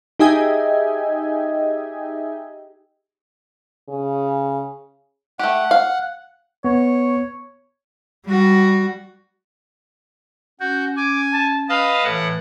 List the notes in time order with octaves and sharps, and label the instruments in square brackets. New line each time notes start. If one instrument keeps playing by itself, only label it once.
[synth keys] D#4 G4 G#4 D#5 E5 G#5
[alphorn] C#3
[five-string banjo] A3 G4 [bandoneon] F#5
[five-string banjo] F5
[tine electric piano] B3 [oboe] C#5
[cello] G3 F#4
[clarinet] C#4 [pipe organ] F#4 [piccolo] G6
[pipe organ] G#5 [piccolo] D6
[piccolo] A5
[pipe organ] B4 D#5 A5 [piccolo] F5
[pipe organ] A2 F#5 [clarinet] E3